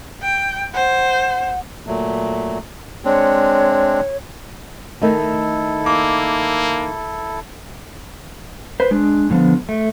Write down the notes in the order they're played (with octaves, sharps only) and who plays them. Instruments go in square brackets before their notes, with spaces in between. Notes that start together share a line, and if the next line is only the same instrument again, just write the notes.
[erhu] G5
[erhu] C5 [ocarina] F#5
[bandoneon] A#2 F#3 A3
[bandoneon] G#3 C4 D4 [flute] C#5
[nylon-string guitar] D#3 A3 D#4 [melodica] E4 A4
[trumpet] A#3 [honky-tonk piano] D6
[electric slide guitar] B4 C5
G#3 D4
A2 D3 F3 B3
A3